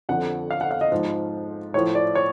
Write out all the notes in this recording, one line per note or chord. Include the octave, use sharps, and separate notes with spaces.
F2 D3 F3 F#5
F5
F#5
F5
D#5
G#2 F3
A2 F3 C#5
D5
C#5